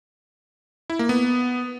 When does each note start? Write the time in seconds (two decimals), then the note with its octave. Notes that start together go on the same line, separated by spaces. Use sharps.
0.90 E4
0.99 A#3
1.09 B3